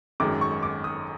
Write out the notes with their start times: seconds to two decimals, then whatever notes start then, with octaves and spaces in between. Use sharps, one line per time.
0.20 G#1 F#2 D#3 G#3 D6
0.41 C#6
0.63 D6
0.84 D#6